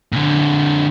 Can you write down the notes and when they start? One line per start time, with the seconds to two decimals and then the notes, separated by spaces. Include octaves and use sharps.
0.12 A#2 D3